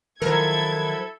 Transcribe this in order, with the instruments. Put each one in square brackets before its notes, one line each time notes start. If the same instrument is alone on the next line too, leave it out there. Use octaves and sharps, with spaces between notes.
[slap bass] D#3 [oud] F3 F#3 A#4 [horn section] E4 A4 [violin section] G#6